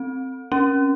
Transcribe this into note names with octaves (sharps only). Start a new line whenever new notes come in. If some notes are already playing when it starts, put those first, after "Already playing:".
Already playing: C4
C#4